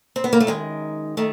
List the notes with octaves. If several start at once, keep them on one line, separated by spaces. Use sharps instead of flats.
C4
B3
A#3
A3
F#2 D#3 G#3
D#3 A3